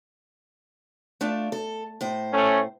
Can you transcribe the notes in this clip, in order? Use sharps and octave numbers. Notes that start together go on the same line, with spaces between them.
A3 D4 F4
A4
A2 C5
A3 C#4